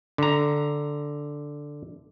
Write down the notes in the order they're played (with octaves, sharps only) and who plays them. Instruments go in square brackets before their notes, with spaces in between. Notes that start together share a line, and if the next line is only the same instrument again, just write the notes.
[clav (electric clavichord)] D3 A#5